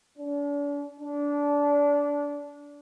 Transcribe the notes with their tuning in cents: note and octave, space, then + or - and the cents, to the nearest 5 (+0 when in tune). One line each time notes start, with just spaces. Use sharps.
D4 -40
D4 -20